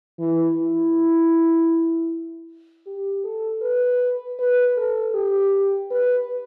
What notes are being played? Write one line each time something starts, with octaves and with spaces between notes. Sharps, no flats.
E3
E4
G4
A4
B4
B4
A4
G4
B4